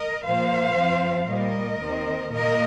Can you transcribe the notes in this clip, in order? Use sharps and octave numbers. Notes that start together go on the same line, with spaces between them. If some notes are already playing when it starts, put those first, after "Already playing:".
Already playing: A#4 D#5
A#2 F3 A#3 C5 F5
F2 F3 C4
A#2 G3 A#3 A#4 D#5
D#2 D#3 C4
A#2 A#3 A#4 D#5